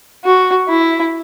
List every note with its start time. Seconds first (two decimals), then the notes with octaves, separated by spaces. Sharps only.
0.24 F#4
0.69 E4